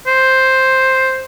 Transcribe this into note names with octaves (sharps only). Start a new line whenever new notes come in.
C5